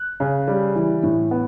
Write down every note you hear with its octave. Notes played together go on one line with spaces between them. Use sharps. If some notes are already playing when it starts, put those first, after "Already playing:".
Already playing: F#6
C#3
G3
E3
A2
B3